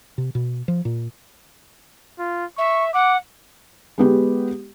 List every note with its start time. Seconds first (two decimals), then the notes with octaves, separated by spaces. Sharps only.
0.18 C3
0.35 B2
0.68 F3
0.85 A#2
2.19 F4
2.58 E5 C#6
2.94 F#5 D6
3.98 G#3 B3 G4